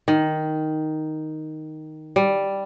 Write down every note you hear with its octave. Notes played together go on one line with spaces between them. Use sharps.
D#3
G3